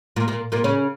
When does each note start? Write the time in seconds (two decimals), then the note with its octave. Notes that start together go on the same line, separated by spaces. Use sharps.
0.16 A#2 A#3
0.28 A#2 A#3
0.52 A#2 A#3
0.64 C#3 C#4